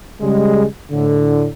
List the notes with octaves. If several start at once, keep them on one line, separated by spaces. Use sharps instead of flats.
C#3 G3 G#3
A2 D3